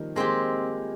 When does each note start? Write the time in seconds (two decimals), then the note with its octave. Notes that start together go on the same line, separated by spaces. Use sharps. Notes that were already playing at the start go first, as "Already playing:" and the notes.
Already playing: D#3 F3 G3 A#3
0.16 G#3 A#3 C4 G4